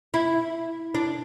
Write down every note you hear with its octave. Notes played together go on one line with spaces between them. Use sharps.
E4
D4